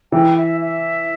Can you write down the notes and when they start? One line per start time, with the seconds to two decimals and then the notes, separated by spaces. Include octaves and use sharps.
0.12 E3 G5
0.37 E5
0.60 E5